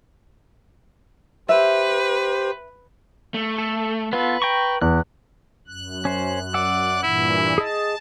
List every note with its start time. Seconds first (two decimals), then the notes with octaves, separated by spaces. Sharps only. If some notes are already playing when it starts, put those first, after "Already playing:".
1.49 G4 B4 C5 E5
3.34 A3
3.58 A4
4.13 B3 F4 A4 B4
4.42 G5 A#5 C#6
4.81 E2 F#6
5.67 F#2 F#6
6.05 C#4 C5
6.54 D5 F#5 E6
7.03 G2 A#2 E3 E4
7.58 G#4 D#5 A5